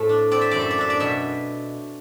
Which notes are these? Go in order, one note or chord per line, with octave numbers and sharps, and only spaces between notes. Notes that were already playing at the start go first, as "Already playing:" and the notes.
Already playing: A2 A3 C4
D4
C4 D5
E5
F#2 D5
E5
D5
D4 E5
D5
B2 E5